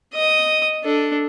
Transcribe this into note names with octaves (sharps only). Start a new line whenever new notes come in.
D#5 D#6
D4 A4